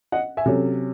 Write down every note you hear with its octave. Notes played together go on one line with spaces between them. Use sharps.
D#5 F#5
E5 G#5
C3 F#3 C#4 A4